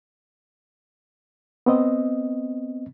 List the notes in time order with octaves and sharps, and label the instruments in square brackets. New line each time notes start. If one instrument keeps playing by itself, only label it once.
[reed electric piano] B3 C4 D#5